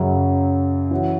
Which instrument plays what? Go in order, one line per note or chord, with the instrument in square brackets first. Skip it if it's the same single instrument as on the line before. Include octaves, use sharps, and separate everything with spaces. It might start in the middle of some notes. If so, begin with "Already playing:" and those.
Already playing: [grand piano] F#2 C#3 F#3
E3 C#4 F#4